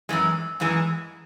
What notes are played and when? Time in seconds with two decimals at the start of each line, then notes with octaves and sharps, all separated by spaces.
0.09 F#2 E3 G#3
0.60 F#2 E3 G#3